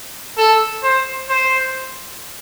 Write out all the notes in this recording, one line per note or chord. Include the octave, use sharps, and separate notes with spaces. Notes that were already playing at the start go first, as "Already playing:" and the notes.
A4
C5
C5